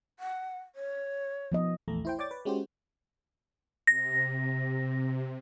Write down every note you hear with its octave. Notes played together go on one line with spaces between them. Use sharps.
F#5
C#5
F3 B3 D#5
A#1 E2 A3 A#5
E4 C5 G5
C#5 D5 G5 D6 A6
B4
G#3 C#4 F#4 G4 C5
C3 A#6